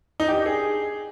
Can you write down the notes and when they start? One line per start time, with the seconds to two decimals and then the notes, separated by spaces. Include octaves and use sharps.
0.20 D#4
0.28 G4
0.37 D4
0.46 G#4